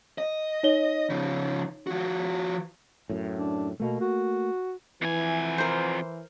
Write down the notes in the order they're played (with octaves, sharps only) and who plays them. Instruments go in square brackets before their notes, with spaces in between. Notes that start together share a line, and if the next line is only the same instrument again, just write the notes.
[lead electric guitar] D#5
[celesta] D#4 C#5 G7
[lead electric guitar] C#3 F3
F3 F#4
[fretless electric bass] F#2 A2
[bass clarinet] D4
[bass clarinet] B2 [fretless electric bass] A3 A#3
[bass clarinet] F#4
[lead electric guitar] F2 G#5 [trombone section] E3
[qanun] A#4 C5